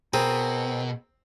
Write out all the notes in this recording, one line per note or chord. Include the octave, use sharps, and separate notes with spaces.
B2 C4 G#4 A#4